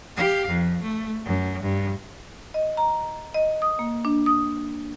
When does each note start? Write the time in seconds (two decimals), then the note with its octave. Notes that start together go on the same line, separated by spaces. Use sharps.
0.16 G4 F5
0.48 F2
0.82 A3
1.25 F#2
1.63 G2
2.54 D#5
2.77 A#5
3.34 D#5
3.62 D#6
3.79 A#3
4.05 D4
4.26 D#6